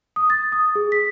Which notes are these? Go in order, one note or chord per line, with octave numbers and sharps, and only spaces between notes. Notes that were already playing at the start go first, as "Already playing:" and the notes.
D#6
A6
D#6
G#4
B6